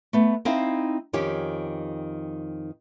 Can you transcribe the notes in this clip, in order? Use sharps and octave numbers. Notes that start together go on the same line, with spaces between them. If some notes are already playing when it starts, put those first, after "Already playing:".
A3 B3
C4 D#4 E4 F5
F2 D#3 C#4 G4